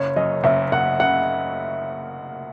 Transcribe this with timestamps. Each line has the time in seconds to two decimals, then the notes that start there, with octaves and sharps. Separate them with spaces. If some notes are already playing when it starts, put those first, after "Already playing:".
Already playing: F#1 C#5
0.16 F#2 D#5
0.44 F#1 E5
0.72 F#1 F#5
1.00 C#3 F#5